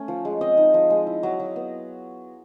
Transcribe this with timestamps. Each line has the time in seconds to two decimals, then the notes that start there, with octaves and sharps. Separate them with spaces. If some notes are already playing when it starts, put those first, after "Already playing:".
Already playing: A3 C#4
0.08 F3
0.25 G#3
0.41 C4 D#5
0.57 D#4
0.74 F3
0.90 G#3
1.07 E4
1.23 F#3
1.39 F#3
1.56 B3